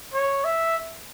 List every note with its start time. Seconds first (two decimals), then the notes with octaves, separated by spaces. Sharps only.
0.14 C#5
0.44 E5